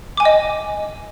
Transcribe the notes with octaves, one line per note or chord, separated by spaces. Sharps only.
D#5 G5 G#5 D6